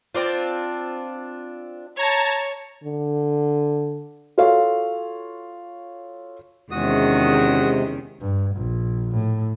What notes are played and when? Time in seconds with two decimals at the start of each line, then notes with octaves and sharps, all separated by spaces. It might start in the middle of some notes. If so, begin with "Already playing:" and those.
0.15 C4 D4 F4
1.97 C#5 A5 A#5 G#6
2.84 D3
4.38 F4 F#4 A4 C#5 F5
6.71 E2 C3 D#3 G#3 C#4 F#4 D#6
8.21 G2
8.56 A#1
9.12 A2